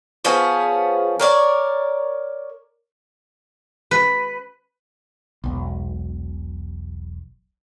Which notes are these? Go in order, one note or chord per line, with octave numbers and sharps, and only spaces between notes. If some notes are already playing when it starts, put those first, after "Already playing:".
F3 B3 C#4 G#4
A#4 C#5 D5
B4
E1 B1